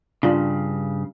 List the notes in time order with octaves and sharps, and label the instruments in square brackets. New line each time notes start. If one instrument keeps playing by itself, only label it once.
[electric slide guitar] G2 C#3 [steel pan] D4 F4